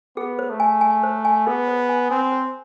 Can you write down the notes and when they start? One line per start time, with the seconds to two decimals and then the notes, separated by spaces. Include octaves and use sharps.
0.17 B3 G#4
0.39 C5
0.50 A3
0.60 G#5
0.81 G#5
1.03 C5
1.25 G#5
1.47 B3 G#4
1.68 C5
1.89 G#5
2.11 C4 G#5
2.32 C5